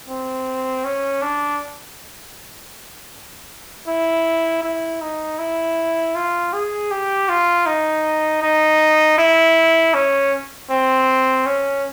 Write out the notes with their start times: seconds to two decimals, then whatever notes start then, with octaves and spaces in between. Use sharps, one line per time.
0.08 C4
0.84 C#4
1.22 D4
3.87 E4
4.63 E4
5.01 D#4
5.39 E4
6.15 F4
6.53 G#4
6.91 G4
7.29 F4
7.66 D#4
8.42 D#4
9.18 E4
9.94 C#4
10.70 C4
11.46 C#4